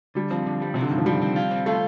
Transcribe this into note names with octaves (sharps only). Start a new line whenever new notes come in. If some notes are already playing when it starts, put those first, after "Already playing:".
D3 G3
F3 C4
D3
G3
C3 C4
D3
G2 D#3
F3
G3 C4
C4
F4
C4
A3 F4